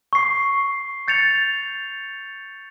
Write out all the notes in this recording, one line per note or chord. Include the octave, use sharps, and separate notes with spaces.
C#6 C7
G6 A6 C#7 F7